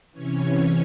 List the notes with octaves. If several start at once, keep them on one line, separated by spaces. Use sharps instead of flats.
C3 E3 C#4 C#5